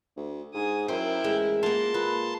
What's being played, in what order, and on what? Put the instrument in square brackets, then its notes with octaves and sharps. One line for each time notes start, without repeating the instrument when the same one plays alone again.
[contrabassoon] D2
[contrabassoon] G#2 [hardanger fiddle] G#4 D#6
[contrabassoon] F#2 [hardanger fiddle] E4 A#4 [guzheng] C5 [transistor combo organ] G5
[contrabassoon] A1 [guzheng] G#3
[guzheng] A#3 F4 [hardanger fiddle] F#5 [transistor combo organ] A5 C6
[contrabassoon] A#2 [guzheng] B4 [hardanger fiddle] A#5